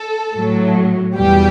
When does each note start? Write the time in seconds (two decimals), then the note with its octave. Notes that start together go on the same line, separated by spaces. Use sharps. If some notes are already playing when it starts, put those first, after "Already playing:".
Already playing: A4
0.35 A2 F#3
1.16 E2 B2 G3 G4